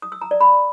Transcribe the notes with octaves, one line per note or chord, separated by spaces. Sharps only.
D#6
E6
A#5
D5
B5